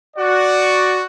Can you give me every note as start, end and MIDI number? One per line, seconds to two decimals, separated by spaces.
0.17 1.00 66
0.17 1.04 74